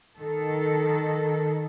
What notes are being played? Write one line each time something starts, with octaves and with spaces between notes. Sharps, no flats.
D#3 A4